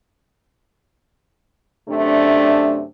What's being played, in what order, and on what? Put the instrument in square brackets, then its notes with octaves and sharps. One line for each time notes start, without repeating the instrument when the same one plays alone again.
[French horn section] F#2 C3 A3 D4